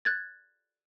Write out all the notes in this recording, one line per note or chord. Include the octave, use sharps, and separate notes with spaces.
F#6 G#6 A6